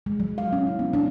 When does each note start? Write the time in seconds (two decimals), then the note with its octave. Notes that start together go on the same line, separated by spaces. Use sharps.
0.06 G#3
0.20 F#3
0.38 F5
0.53 C#4
0.67 E4
0.79 B3
0.93 D4